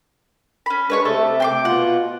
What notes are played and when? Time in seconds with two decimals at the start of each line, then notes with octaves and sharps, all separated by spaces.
0.66 C#4 B5
0.90 G#3 D4 B4 C#5 C#6
1.05 C3 A3 A4
1.40 G5 C6 D6
1.65 B2 F4 F#5